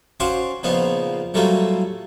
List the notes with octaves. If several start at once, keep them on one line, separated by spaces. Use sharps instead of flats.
C#4 F#4 C5 D5 F5 C6
A#2 C#3 F3 B3 D#4
A2 F#3 G3 A3 A#3 F4